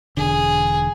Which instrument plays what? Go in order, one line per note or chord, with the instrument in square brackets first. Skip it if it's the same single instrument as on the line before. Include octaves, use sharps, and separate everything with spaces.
[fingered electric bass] E1 D3 [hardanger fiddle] G#4